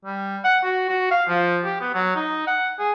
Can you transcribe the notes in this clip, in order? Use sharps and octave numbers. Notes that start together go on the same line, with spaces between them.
G3
F#5
F#4
F#4
F5
F3
G4
B3
F#3
D#4
F#5
G#4